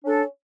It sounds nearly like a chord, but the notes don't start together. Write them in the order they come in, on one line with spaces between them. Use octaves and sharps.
C#4 D4 A4